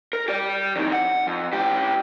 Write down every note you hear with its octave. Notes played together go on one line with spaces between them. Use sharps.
A#4
G4 D5
F2 D#3
F#5
F2
A2 G4